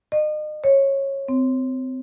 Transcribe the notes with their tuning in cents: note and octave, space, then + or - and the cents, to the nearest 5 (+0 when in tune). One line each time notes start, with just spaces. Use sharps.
D#5 -35
C#5 -20
C4 -25